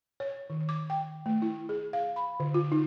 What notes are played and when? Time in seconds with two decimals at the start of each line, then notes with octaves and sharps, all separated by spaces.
0.20 C#5
0.50 D#3
0.69 D6
0.90 G5
1.26 A3
1.42 E4
1.69 G#4
1.93 F5
2.16 B5
2.40 D3
2.54 F4
2.72 D#4